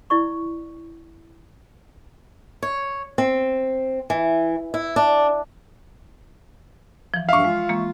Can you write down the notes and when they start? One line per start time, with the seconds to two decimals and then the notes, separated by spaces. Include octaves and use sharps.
0.10 E4 D5 C#6
2.63 C#5
3.18 C4
4.10 E3
4.74 E4
4.96 D4
7.14 E3 F3
7.29 G2 E5 F5 C#6
7.45 G#3 F4
7.69 E3 G#3 A#3